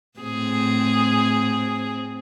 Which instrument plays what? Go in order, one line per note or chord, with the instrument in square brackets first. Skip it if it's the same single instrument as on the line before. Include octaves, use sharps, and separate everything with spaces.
[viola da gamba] A2 C4 G#4